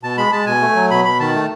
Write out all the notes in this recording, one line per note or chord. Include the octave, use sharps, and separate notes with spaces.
B2 A5
G#3 B5
G#3 A5
B2 G#5
A3
F#3
B2 B5
B2 B5
D#3 A5
A3